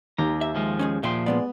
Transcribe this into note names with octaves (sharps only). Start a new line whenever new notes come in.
D#2 G4 A#5
E5
D#3 F3 G#3
C#4 D#4 G#4
A#2 F3 G#4 E5 G5 C6
G#2 G#3 B3 D5